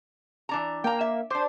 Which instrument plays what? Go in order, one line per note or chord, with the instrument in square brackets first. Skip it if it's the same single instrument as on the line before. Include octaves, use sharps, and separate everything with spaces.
[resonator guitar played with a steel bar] E3 D4 A#5
[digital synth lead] A#3 [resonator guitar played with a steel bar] G5 A#5
[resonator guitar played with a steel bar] E5
[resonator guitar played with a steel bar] D4 G4 [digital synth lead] C5